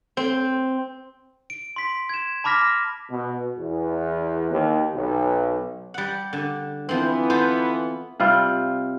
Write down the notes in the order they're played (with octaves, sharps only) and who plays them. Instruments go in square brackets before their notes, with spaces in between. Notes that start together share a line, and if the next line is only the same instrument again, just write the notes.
[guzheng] C4
[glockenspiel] D7
C6 B6
G#6 E7
A5 B5 D6 F6 A#6 B6
[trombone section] B2
E2
D#2
B1
[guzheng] G3 F#5
D3
[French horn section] E3 B3 [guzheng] F3 C4
[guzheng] F4 A4 C5
[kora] C3 G3 F4